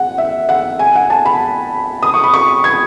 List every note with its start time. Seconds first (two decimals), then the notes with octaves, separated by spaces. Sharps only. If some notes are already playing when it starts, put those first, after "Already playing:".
Already playing: F#5
0.18 E5
0.49 F#5
0.79 G#5
0.95 F#5
1.10 A5
1.26 B5
2.03 D#6
2.14 C#6
2.24 B5
2.34 C#6
2.64 G#6